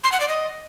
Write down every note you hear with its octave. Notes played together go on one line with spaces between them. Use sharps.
C6
F#5
D5
D#5